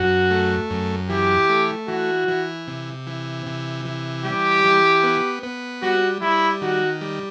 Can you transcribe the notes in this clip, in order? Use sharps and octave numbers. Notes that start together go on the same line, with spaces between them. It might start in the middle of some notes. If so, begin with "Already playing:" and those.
Already playing: F#2 F#4
A3
F#2
E3 G4
A3
E3 F#4
E3
C3
E3
C3
E3
G3 G4
E3
B3
B3
G3 F#4
G3 E4
D#3 F#4
G3